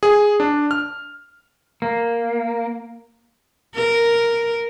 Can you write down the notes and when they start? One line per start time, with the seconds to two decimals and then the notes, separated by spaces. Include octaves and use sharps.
0.03 G#4
0.40 D4
0.71 F6
1.82 A#3
3.75 A#4